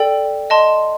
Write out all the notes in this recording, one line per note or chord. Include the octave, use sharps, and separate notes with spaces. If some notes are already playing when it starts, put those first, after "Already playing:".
Already playing: A4 D5 G5
D#5 A5 C6